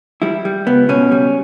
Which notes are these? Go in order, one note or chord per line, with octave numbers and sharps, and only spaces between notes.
G3 E4
G3
C#2 B3
B2 C#4
G3